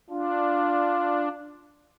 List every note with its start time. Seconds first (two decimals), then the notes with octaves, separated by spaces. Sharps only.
0.10 D4 F4